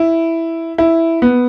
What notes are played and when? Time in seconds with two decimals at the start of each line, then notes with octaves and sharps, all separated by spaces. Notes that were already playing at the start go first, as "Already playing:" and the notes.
Already playing: E4
0.78 E4
1.22 B3